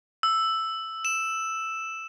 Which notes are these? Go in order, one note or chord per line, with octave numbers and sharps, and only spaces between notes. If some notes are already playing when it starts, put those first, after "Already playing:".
E6
E7